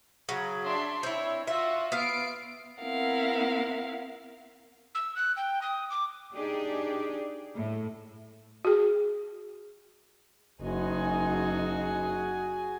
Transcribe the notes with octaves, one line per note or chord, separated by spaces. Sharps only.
C#3 F#3
D4 E5 C6
C4 E4 C#5
F4 F#4 E5
B3 F5 C7 D7
B3 C4 E4 A#4 F5 F#5
E6
F#6
G5
D#6
D6
D4 D#4 G4 G#4 D5
A2
F#4 G#4
F#1 D#4 F#4 G#4 G#5